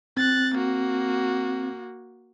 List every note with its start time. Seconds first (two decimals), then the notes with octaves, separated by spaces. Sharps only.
0.17 C4 F#6 A6
0.55 A#3 F#4